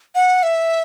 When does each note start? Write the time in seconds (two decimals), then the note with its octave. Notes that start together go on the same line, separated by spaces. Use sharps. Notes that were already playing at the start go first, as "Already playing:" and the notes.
0.15 F#5
0.43 E5